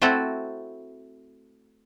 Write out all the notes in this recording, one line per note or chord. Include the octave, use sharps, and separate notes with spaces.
A3 C4 E4 F#4 A4